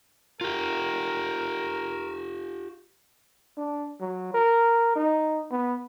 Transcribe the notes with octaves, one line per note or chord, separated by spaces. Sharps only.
F4 G4 A#4
D4
F#3
A#4
D#4
B3